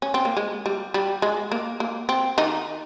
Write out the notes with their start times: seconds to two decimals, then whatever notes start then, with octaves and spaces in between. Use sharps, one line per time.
0.02 C#4
0.14 C4
0.25 A#3
0.37 G#3
0.66 G3
0.94 G3
1.22 G#3
1.51 A#3
1.80 A#3
2.09 C4
2.38 D#3 D#4